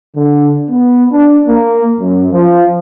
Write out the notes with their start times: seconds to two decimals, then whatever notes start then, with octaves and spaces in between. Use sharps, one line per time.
0.17 D3
0.69 B3
1.11 D4
1.48 A#3
1.99 F#2
2.32 F3